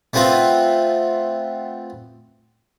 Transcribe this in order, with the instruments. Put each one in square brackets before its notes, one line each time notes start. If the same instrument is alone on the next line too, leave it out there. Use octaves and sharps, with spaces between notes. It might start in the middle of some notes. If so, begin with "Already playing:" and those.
[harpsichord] A3 B3 C4 F4 B4